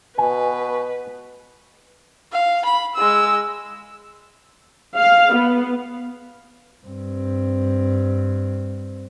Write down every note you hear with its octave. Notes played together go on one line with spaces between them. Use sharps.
B2 B4 G#5
F5
B5
G#3 E6
F5
B3
G2 C4